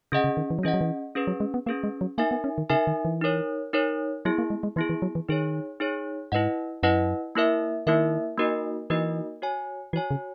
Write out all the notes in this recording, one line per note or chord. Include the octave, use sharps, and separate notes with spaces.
C#3 C#4 G#4 D#5 F#5
C#3
D#3
E3
F#3
E3 C#4 G#4 D#5 F#5
F#3
E3
C#4 G#4 B4
F#3
G#3
B3
A#3 C#4 G#4 B4
G#3
F#3
A#3 D#4 A#4 E5 G#5
B3
C#4
D#3
C#3 D#4 A#4 E5 G#5
D#3
E3
D#4 A#4 C#5
D#4 A#4 C#5
F#3 B3 E4 G#4
A#3
G#3
G#3
E3 B3 E4 G#4
E3
F#3
E3
D#3 D#4 G#4 C#5
D#4 G#4 C#5
G#2 E4 B4 D#5 F#5
F#2 E4 B4 D#5 F#5
A#3 E4 A#4 E5
D#3 A#3 E4 A#4 E5
A#3 D#4 F#4 A#4 D#5
E3 A#3 D#4 F#4 A#4 D#5
F#4 C#5 G#5
E3 F#4 C#5 G#5
C#3